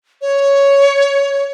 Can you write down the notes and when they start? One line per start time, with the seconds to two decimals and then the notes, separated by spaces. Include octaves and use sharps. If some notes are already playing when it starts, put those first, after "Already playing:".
0.21 C#5